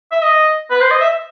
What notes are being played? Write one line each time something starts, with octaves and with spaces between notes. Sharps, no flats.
E5
D#5
B4
C5
D#5
E5